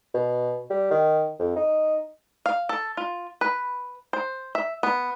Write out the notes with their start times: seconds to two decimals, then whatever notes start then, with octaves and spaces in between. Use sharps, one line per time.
0.14 B2
0.70 G3
0.91 D#3
1.39 F2
1.56 D#4
2.46 F5
2.69 A4
2.97 F4
3.41 B4
4.13 C5
4.55 E5
4.83 B3